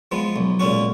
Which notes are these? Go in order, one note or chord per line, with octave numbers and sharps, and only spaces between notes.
F3 G#3 B3
B1
A#2 G#3 C#4 F#4